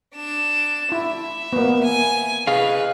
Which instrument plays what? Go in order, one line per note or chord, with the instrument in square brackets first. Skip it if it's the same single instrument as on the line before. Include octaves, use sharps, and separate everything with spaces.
[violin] D4 E7
[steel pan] E4 [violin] E5
[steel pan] A#3 B3
[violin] G#5
[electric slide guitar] G#4 D#5 F5 [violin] B4